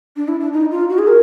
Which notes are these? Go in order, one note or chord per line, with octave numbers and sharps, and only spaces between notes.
D4
E4
D4
D#4
F4
F#4
G#4
A#4